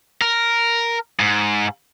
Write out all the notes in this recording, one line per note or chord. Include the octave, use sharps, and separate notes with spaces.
A#4
G#2